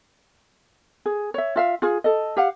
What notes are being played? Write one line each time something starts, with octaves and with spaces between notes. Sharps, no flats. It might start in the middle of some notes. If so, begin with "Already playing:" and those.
G#4
C#5 E5
F4 E5 F5
F4 G#4
A4 D#5
G4 F5 F#5